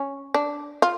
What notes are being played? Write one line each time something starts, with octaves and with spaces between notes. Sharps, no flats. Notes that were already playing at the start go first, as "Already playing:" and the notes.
Already playing: C#4
D4
F4